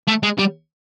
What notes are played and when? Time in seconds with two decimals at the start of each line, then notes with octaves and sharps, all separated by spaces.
0.08 A3
0.23 G#3
0.39 G3